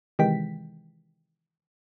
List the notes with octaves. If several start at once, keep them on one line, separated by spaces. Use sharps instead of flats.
C3 D#3 E3 G#3 G5 B6